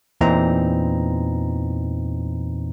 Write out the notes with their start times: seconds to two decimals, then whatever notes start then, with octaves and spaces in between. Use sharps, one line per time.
0.21 E2 A#2 E3 C4 D#4 A#5